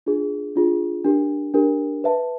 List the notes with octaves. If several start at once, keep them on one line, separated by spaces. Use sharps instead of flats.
D4 F4 G#4
D4 F4 G#4
D4 G4 A#4
D4 G4 A#4
B4 E5 A5